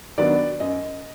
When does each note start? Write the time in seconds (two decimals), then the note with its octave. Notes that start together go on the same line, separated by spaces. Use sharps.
0.18 D#3 F#3 B3 D4 D5
0.60 F#2 D#5